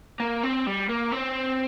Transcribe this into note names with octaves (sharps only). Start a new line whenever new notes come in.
A#3
C4
G3
A#3
C4